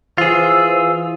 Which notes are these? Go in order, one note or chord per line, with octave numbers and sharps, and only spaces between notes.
E3 F4 G#4 C5 E6